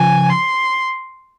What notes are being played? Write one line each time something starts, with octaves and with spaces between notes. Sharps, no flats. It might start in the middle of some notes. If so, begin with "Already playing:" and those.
Already playing: C#3 F3 G#5
C6